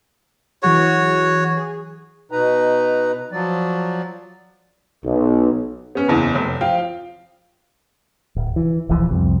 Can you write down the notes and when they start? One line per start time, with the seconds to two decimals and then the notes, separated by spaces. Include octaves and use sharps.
0.63 E3 F#3 F#4 G#4 C#5
1.57 G#4
2.31 B2 D#4 B4 A#5
3.32 F3 F#3 D5
5.04 B1
5.95 B3 C#4
6.08 F#1 E2
6.35 F1
6.61 F3 F5 G5
8.36 D1
8.56 E3
8.89 D#1 B1 E3 F3
9.10 C2 F2 C3